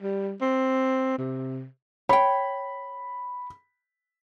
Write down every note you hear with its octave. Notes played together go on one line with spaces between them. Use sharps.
G3
C4
C3
C#5 G5 B5